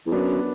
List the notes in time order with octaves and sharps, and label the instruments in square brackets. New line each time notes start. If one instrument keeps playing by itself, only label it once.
[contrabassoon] E2
[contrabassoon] F#2 [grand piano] B3 D4